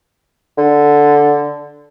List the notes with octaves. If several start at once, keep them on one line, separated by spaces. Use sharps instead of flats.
D3